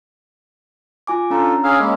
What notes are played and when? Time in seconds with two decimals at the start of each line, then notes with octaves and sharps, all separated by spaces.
1.07 F4 G#5 D6
1.30 C#4 D4 F4 A4 A#5
1.64 C#4 G#4 F5 E6
1.80 G#3 A#3 C#4 D#5 B5